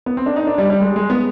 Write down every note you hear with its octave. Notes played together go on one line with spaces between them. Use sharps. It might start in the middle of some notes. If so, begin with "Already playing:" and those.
B3
C4
D4
D#4
D4
G3
G3
G#3
G#3
B3